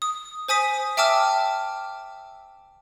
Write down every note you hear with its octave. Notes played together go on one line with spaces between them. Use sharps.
D#6
C5 G#5 D#6 B6
E5 G5 A5 D6 E6 F6